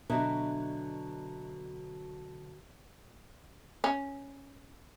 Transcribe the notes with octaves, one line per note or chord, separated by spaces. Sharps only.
B2 D3 F#3 D4 D#5 E5
C#4